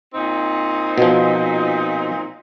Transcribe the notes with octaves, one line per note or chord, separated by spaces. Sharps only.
A#2 C4 D#4
B2 F3